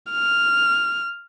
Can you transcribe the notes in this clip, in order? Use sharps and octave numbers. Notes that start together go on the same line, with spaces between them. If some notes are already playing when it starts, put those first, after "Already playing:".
F6